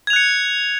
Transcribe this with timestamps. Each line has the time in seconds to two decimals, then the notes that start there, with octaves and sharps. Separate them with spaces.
0.07 G#6
0.10 F7
0.13 F#6
0.16 C#7